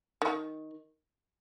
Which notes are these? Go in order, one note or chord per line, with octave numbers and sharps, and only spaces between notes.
D#3